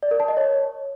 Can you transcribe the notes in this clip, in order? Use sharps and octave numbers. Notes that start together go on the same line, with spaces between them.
D5
A#4
A5
D#5
C#5